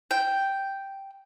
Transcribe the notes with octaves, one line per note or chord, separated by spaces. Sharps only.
G5